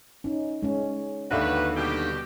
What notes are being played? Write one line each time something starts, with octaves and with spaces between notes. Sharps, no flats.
C#4 D#4
G#3 C#4
D#2 D3 D#4 F#4 G4 B4 E5
B2 G3 G4